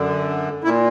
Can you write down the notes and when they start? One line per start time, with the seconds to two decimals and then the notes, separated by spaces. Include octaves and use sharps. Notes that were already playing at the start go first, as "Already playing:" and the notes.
Already playing: F#2 D3
0.64 A#2 E4